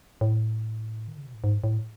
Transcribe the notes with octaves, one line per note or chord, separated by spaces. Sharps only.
A2
D#3
C#3
B2
A2
G#2
A2